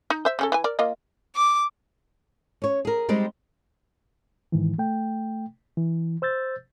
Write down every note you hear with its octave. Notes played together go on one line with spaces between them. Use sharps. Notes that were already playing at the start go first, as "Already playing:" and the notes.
D#4
C5 E5
C#3 C#4 A4
E3 G#5
A#4 D5
A#3 F4 D#5
D6
C#4 C#5
G#4 A#4
G3 G#3 C4 D#4 G4
G#2 D#3 E3
A3 G5
E3
C5 E6 G6 A6